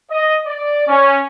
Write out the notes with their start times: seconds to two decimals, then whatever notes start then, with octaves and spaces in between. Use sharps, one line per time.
0.11 D#5
0.47 D5
0.88 C#4